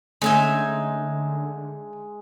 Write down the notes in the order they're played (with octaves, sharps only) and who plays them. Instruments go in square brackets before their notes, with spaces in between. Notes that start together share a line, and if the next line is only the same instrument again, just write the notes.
[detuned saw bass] D3 [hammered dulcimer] G#3 [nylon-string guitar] A3 C#4 [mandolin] D#4 E5 G#5